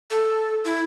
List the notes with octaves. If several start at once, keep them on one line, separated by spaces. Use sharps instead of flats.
A4
E4